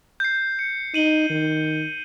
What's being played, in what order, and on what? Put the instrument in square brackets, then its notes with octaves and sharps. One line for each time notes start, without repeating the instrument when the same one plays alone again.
[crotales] G6 C7
C#7
[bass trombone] D#4 [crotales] D#7 F#7 G7
[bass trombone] D#3